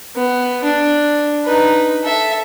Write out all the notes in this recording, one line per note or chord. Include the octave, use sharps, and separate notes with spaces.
B3
D4
D#4 B4
A4 E5